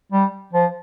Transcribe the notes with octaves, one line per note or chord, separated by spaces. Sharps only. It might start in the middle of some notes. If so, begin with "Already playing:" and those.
G3
F3